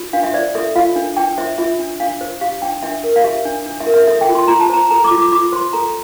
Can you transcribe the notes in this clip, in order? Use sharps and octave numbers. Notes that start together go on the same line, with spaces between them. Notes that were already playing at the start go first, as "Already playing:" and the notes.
Already playing: F4
D4 F5
E5
C5 D5
A4 E5
F4 F5
D4
D4 G5
C5 E5
F4 E5
D4
D4 F5
C5
G4 F5
D4 G5
D4 E5
A#4
F5
G4 E5
D4
D4
E5
A#4
E5
A4 E5
G5
F4
C6
F4 A#5
A5
C5 A#5
A4 A#5
D6
F4
D6
F4 D6
C5 C6
A4 A#5